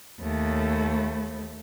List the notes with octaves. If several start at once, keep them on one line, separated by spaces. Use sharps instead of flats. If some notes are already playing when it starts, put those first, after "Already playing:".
D#2 A3